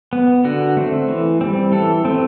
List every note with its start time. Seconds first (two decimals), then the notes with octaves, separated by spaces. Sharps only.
0.13 B3
0.44 D3 F#4
0.77 A3 C4
1.08 E3
1.41 G3 C4
1.72 E3 A4
2.05 A3 C4